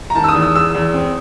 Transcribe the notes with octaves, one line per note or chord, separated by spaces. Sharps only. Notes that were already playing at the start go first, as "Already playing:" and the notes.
A#5
D#3 A5
E6
D#6
E2
E6
E2 E6
E2
C4